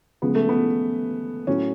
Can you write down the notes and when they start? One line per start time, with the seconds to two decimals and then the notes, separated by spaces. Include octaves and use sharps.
0.22 C#2 C#3 F3 G#3 B3
0.35 A3
0.49 B3
1.47 A2 F#3 C#4